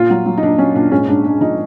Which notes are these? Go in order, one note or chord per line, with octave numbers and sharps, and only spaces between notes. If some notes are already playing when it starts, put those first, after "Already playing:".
Already playing: A#2 F4
F#3
F#3
D#4
A#2 D4
F#3 C#4
A#2 D4
G#2 C#4
G#2 D4
G#3 D4
F3 D#4